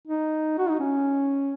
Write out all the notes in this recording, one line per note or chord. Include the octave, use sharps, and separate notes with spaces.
D#4
F#4
D#4
C#4